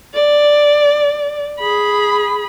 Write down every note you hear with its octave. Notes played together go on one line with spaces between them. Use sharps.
D5
G#4 B5